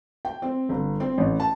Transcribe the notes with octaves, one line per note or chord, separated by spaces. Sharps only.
G5
C4
G1
C4
A1
A5